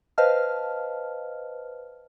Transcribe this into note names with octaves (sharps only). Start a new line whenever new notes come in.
B4 C5 D#5 F5 A5 F6